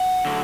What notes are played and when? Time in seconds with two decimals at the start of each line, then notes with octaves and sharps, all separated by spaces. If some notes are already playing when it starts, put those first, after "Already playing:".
Already playing: F#5
0.25 D3 F#3 A3